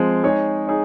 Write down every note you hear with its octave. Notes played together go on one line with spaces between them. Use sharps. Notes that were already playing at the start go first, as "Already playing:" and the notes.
Already playing: F3 G#3 C4
G#3 D#4 G#4 C#5
D#4 G#4 C#5